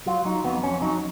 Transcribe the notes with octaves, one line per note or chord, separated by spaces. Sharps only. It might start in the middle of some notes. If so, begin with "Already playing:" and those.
F#3 F4
F#3 D#4
F2 B3
F2 C#4
F#3 D#4